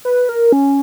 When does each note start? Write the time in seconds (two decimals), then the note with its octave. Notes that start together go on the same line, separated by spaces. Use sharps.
0.05 B4
0.29 A#4
0.52 C#4